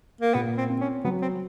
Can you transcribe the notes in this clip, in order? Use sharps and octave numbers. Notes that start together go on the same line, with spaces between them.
A#3
A#2 B3
C4
C4
C#4
F#3 B3
C4